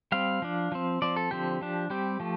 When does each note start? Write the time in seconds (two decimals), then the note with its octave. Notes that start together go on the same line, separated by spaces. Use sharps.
0.12 G3 C4 F5
0.42 F3 D4
0.72 F3 C4
1.02 F3 C4 D5
1.16 A4
1.31 D3 F3 C4 G4
1.61 F3 D4
1.90 G3 C4 G4
2.20 F3 A3